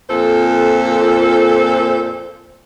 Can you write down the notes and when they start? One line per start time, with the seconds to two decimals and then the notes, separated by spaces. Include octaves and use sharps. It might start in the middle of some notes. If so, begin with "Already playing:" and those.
0.09 F2 A#2 A4 C5